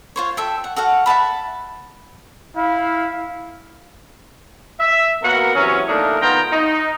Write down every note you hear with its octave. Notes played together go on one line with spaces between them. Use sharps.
F4 C5 C#5
A4 E5 G5
F#5
F#4 A4 F5 F#5
E5 F#5 A5 B5
E4 F5
E5
A#3 B3 F#4 A#4
C3 E3 F#3 C#4
A#2 A3 D4 D#4 A#4
D#3 B3 F4 G5 A#5
D#4